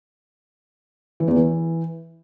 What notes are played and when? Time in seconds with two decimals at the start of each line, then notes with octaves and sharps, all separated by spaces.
1.20 E3
1.28 E2
1.36 E3